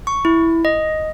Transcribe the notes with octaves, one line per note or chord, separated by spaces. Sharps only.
C#6
E4
D#5